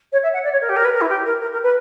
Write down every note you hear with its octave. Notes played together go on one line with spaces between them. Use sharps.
C#5
E5
F#5
D5
C#5
A#4
G4
A#4
B4
A#4
E4
G4
A#4
A#4
A#4
B4